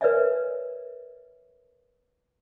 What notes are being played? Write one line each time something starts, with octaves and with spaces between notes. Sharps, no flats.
A#4 B4 C#5 D5 E5 G#5